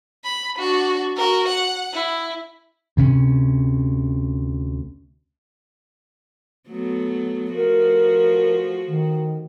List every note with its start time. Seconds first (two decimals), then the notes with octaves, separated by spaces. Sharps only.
0.24 B5
0.58 D4 F#4
1.17 F#4 A#4
1.48 F#5
1.94 E4
2.97 D2 C3 C#4
6.69 F#3 A3 B3
7.54 F3 A3 F#4 A#4
8.87 D#3